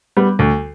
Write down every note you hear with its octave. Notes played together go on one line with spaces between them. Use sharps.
G3 B3
D2